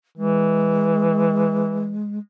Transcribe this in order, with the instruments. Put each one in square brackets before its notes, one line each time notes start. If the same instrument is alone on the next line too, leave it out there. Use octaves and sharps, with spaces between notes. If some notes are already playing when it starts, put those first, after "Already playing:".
[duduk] E3 [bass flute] G#3